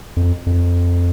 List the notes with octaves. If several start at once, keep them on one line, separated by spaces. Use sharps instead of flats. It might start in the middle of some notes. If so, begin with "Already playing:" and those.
F2
F2